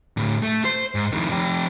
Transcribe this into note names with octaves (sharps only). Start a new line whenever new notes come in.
A2 D3
A3
C5
G#2
F2 D#3
F2 G4